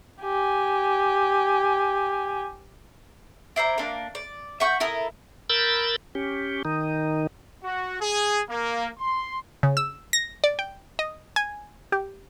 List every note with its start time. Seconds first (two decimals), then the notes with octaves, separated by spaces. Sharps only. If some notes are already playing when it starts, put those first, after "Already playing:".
0.22 G4 G#5
3.56 E4 C5 D5 A#5
3.78 A#3 D4
4.15 D5
4.60 E5 F#5 C#6 G6
4.80 E4 A4 A#4 D#6
5.50 A#4 B5 E6 G6 A6
6.15 C#4 G4
6.65 D#3 D#4
7.64 F#4
8.01 G#4
8.50 A#3
8.99 C6
9.63 C#3
9.77 E6
10.13 A#6
10.44 D5
10.59 G5
10.99 D#5
11.36 G#5
11.92 G4